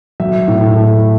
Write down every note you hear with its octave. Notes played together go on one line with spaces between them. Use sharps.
F#3 E5
A2
A3